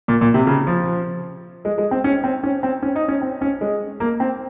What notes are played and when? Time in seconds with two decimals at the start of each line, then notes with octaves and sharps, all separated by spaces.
0.08 A#2
0.21 A#2
0.34 C3
0.47 C#3
0.67 F3
1.65 G#3
1.78 G#3
1.91 C4
2.04 C#4
2.24 C4
2.43 C#4
2.63 C4
2.82 C#4
2.95 D#4
3.08 C#4
3.21 C4
3.41 C#4
3.61 G#3
4.00 A#3
4.20 C4